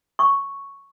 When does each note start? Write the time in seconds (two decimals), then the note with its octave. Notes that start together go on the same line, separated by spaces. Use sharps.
0.19 C#6